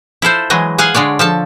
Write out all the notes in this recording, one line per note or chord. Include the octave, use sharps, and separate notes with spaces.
E4 F4 A4 C5
E3 F#3 G#3 D#5
G#4 F5 F#5 G#5
D3 G#3 C#5 D5
F3 A4 A5